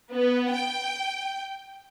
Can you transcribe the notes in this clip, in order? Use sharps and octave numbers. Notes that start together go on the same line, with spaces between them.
B3
G5